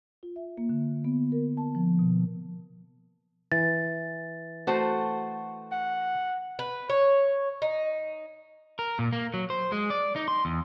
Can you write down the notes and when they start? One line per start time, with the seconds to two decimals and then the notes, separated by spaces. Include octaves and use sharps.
0.23 F4
0.36 E5
0.58 A#3
0.69 D3
1.05 B3
1.32 A#4
1.57 A5
1.75 F3
1.99 B2
3.52 E3 A6
4.67 A3 F#4 C5
5.72 F#5
6.59 B4
6.90 C#5
7.62 D#4
8.79 A#4
8.99 A#2
9.13 A#3
9.34 F#3
9.50 C5
9.72 G#3
9.90 D5
10.16 D#4
10.28 C6
10.45 E2